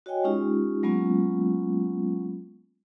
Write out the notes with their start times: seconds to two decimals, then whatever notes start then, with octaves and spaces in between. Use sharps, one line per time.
0.06 F#4 C#5 D#5 G5 G#5
0.24 G#3 C#4 D#4 F4 G4
0.83 F#3 G#3 A#3 B3 C#4 F4